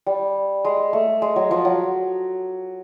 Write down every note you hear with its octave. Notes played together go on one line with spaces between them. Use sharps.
G3
G#3
A3
G#3
F#3
F3
F#3